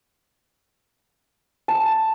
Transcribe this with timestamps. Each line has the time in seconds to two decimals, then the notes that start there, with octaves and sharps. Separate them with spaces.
1.68 A5